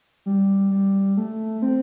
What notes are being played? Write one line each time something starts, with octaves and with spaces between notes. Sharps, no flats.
G3
G3
A3
C4